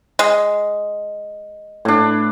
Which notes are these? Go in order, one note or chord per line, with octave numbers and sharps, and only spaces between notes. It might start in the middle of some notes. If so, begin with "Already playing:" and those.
G#3
A2 D4